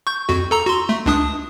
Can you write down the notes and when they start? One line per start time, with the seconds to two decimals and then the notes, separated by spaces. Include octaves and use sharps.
0.07 C#6 G6
0.29 F2 F#4
0.51 A4 A#5 E6
0.66 F#4 C6
0.89 A3
1.06 C#2 D4 D#6